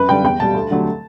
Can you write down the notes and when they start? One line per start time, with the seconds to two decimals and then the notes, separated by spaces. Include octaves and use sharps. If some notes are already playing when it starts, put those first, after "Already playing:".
Already playing: F#2 B4
0.09 D3 G3 G5
0.24 E2 G5
0.39 B2 G3 A5
0.54 D2
0.71 D3 F#3 A3